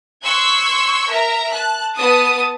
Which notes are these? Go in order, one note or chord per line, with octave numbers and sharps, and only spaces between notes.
C6 C#6 E6 F#6 G#6
A#4 E5 A#5
A5 F#6
B3 A5 D#6